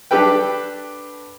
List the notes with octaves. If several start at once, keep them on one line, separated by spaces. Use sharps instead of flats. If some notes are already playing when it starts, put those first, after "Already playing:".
D4 G4 A4 B4 G5